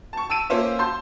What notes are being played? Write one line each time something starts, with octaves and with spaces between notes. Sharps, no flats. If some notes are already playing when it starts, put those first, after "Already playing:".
A5 C#6
A5 E6 D7 D#7
A#3 C#4 F4 C5 E5
A5 C6 G6